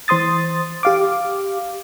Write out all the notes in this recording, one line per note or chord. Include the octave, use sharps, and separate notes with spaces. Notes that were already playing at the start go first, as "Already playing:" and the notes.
E3 C5 C6 D#6 A6
G4 F5 D6